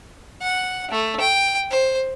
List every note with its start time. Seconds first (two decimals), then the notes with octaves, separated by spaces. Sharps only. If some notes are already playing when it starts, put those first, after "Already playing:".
0.42 F#5
0.91 A3
1.20 G5
1.70 C5